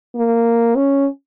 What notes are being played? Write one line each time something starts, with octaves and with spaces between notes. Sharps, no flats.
A#3
C#4